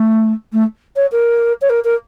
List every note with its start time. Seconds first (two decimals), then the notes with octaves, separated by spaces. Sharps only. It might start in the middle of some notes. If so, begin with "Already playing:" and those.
Already playing: A3
0.52 A3
0.96 C#5
1.11 A#4
1.61 C#5
1.69 A#4
1.84 A#4